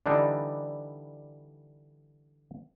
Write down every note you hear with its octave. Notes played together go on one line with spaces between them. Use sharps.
D3 E3 G3 D4 D#4